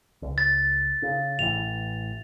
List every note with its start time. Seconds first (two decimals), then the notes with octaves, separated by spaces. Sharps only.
0.22 C#2
0.38 A6
1.02 C#3
1.39 A1 E3 F7